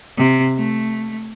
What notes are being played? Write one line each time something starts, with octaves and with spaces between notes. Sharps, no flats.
C3
A3